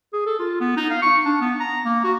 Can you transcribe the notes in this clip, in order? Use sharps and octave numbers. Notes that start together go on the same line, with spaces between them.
G#4
A4
F4
B3
D#4
F5
C#6
D4
B3
A#5
A#3
F#4